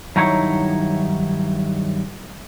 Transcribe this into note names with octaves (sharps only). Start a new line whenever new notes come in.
G2 D#3 F#3 D#4 E4 C#5